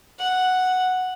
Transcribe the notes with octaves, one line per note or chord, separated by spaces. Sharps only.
F#5